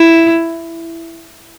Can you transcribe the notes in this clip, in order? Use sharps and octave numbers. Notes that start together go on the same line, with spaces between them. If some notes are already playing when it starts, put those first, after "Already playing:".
Already playing: E4